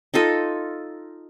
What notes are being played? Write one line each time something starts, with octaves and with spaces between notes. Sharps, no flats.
D#4 F4 A4 D#5